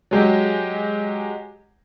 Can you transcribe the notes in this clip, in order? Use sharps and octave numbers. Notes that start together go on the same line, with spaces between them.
F#3 G#3 G4